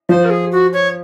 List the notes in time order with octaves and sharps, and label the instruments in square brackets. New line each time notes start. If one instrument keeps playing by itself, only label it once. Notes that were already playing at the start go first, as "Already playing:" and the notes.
[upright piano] F3 [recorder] C5
[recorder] A#4
G#4
F#4
C#5